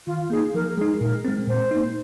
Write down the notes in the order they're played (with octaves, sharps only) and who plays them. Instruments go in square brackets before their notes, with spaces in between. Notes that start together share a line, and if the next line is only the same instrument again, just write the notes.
[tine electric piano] D#3 [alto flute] F4
[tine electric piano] A#3 D#4 [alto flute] G#4
[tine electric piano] F3 [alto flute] A#4
[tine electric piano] G#3 D#4 [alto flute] G#4
[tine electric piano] A#2 [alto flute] A#4
[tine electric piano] G#3 C4
[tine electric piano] A#2 [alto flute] C5
[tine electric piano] A#3 D#4